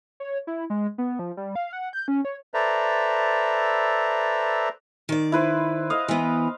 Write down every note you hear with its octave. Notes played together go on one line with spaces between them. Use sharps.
C#5
E4
G#3
B3
F3
G3
F5
F#5
G6
C#4
C#5
A4 B4 C5 D5 E5 A#5
D#3 D5
E4 B4 C5
D#5 F5
E3 B3